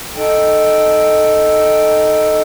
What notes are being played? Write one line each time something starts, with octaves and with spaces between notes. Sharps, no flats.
D#4 A4 G5